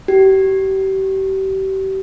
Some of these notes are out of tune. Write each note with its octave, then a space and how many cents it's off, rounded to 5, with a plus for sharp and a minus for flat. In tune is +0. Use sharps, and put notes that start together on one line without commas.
G4 -35